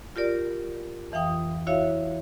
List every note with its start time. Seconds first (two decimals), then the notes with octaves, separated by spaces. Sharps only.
0.16 F4 G4 A#4 D5
1.12 F2 E3 F5 G5 D#6
1.67 E4 F#4 C#5 E5 F5